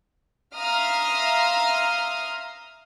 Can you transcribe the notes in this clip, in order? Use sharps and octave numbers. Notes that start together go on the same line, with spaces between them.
E5 F5 A#5 C6 D#6 F6